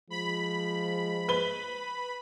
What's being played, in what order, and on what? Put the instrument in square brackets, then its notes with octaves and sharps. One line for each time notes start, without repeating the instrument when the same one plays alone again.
[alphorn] F3 [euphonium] G#3 [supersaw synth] B5
[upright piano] B4 G7